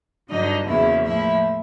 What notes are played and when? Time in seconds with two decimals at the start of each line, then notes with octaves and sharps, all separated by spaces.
0.29 G2 D3 F#3 D#4 D#5
0.67 E2 C#3 F#3 A#3 E4 E5
1.05 A2 F3 A#3 E4 E5